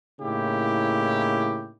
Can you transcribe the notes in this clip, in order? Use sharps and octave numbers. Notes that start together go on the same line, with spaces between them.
A2 C#3 A#3 D#4 E4 G4